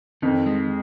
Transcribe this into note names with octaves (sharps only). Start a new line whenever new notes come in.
F2 D#3
G#3